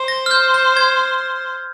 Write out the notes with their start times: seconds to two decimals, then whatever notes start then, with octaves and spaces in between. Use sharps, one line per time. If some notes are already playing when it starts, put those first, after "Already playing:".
Already playing: C5
0.08 A#6
0.26 F6
0.31 G6
0.54 G6
0.77 G#6